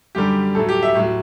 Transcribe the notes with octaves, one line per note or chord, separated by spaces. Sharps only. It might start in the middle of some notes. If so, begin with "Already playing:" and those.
F#2 D3 G3 G4
A2 F#3 A4
G4
E5
A2 F#3